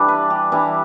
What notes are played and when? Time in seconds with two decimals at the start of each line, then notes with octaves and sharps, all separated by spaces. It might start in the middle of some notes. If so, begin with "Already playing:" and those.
Already playing: E3 G3 D4 D5 E5
0.08 B4
0.30 G4
0.52 E3 G3 D4 E4